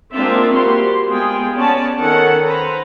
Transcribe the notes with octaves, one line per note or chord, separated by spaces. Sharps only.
G#3 A#3 C4 D4 F4 E5
G3 A#3 F#4 G4 C5 C6
G#3 B3 F4 G#4 G5
B3 C#4 C#5 D5 A5
D#3 C#4 A4 F#5
B4 C5 A#5